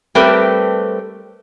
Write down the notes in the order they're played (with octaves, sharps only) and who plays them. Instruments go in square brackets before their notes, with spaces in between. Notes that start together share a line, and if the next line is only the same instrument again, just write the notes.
[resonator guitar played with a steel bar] G3 A3 C4 G4 A#4 B4